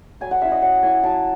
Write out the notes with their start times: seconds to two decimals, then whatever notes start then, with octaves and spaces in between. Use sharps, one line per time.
0.21 F#3 G#5
0.31 F#5
0.41 C#4 E4 E5
0.52 D#5
0.62 F#3 F#5
0.83 C#4 E4 G#5
1.03 F#3 A5